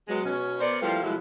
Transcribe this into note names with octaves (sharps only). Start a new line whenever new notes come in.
F#3 G#3 B3
B2 C#4
B3 A#4 C5 D5
F3 G3 A3 A#3 E4 F4
B2 F3 F#3 G#3 E4 B4